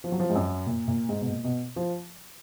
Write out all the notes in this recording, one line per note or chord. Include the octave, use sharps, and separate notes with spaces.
F3
F#3
F3
G#2
F#2
A#2
A#2
G#2
B2
A#2
B2
F3